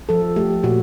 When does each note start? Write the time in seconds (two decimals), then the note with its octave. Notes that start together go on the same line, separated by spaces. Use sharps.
0.09 F3 A4
0.36 A3 G4
0.63 A#2 F#4